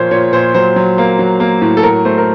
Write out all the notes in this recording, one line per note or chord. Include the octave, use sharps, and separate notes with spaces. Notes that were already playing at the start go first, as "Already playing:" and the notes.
Already playing: A#2 F3 A#3 C5 C#5
A#2 C#5
A#2 C5
F#3 C5
F#3
A#3
F#3
A#3
A2
A4
F#3 A#4
A3 C5
A#4